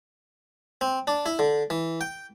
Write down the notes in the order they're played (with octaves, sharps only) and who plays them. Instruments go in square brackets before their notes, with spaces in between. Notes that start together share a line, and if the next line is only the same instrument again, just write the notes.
[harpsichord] C4
D4
E4
D3
E3
G5